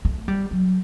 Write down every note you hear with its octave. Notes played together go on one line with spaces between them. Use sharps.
A3
G3
F#3